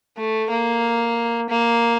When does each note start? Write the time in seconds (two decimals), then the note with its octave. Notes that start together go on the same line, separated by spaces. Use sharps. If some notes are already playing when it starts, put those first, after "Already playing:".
0.17 A3
0.50 A#3
1.50 A#3